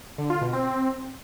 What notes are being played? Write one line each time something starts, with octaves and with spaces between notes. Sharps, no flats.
D3
F4
B2
C4